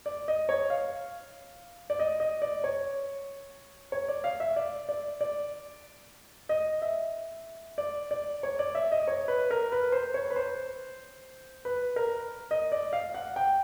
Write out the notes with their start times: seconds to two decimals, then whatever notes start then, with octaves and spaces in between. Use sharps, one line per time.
0.06 D5
0.28 D#5
0.49 C#5
0.70 F5
1.90 D5
1.99 D#5
2.20 D#5
2.42 D5
2.64 C#5
3.92 C#5
4.08 D5
4.24 F5
4.40 E5
4.56 D5
4.89 D5
5.21 D5
6.49 D#5
6.82 E5
7.78 D5
8.11 D5
8.43 C#5
8.59 D5
8.75 E5
8.92 D#5
9.08 C#5
9.28 B4
9.51 A#4
9.72 B4
9.92 C5
10.14 C#5
10.30 B4
10.36 C5
11.65 B4
11.96 A#4
12.51 D#5
12.72 D5
12.93 F5
13.14 F#5
13.36 G5